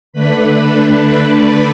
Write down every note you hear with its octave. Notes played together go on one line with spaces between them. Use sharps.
D3 A3 D4 B4 B5